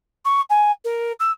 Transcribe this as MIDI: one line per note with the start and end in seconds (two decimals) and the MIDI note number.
0.25 0.41 85
0.50 0.71 80
0.85 1.12 70
1.20 1.31 88